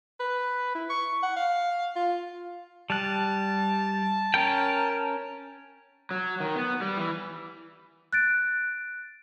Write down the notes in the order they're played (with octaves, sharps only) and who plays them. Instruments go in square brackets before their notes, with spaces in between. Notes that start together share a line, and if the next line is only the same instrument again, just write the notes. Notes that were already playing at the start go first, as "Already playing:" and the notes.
[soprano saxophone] B4
E4
C#6
F#5
F5
F4
[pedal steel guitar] G3 F#6 [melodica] A5
[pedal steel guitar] C#4 A#4 G5
[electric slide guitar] F#3
D#3
B3
G3
E3
[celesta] F#6 A6 D7